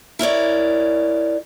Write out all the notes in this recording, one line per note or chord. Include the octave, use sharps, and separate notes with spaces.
E4 A#4 C#5 D5